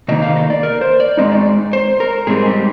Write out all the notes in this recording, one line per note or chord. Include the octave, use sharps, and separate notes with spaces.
C3 D#3 A#3 D#4 D#5
F5
D#5
D5
A#4
C5
D5
G#2 D#3 G#3 C4 D#4 D#5
D5
C5
A#4
G#2 G3 C4 D#4 G#4
G4